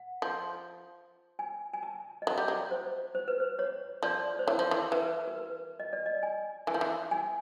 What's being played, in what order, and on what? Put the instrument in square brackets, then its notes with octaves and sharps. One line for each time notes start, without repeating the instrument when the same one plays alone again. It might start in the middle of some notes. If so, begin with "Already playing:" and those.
Already playing: [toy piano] F#5
[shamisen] F3
[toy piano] G#5
G#5
A5
D#5
[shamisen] F#3 [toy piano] E5
[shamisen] G3
F#3
[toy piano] C5
C5
B4
C5
C#5
[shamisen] F3 [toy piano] D5
[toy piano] C5
[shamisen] E3 [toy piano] C#5
[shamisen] F3
E3
[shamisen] E3 [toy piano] B4
[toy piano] A#4
B4
D#5
D5
D#5
G#5
[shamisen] E3 [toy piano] G#5
[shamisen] F3
E3
[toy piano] G#5